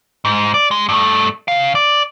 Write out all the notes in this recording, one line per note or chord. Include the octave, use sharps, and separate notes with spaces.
G#2
D5
G#3
G2 A3
C#3 F5
D5